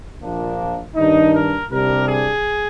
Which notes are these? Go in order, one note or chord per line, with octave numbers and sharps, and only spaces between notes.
A#1 A#2 F3 A#3 D4
G2 D#3 G3 D4 D#4
A#4
C2 C3 G3 D4 A#4
G#4